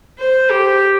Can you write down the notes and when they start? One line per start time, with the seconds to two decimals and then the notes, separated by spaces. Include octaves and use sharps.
0.19 C5
0.51 G4